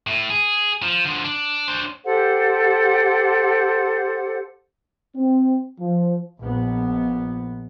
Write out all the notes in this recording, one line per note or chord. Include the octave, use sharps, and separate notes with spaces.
A2
G#4
F3
D3 F3
D4
D4 C5
G4 A4 C5 F#5
C4
F3
A#1 B3